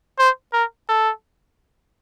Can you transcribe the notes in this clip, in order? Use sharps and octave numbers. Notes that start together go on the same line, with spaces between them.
C5
A#4
A4